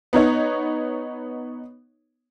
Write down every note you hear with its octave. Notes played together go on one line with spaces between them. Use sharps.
B3 D#4 C#5